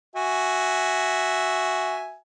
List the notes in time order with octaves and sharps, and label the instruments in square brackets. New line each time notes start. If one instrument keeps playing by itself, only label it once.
[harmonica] F#4 E5 G#5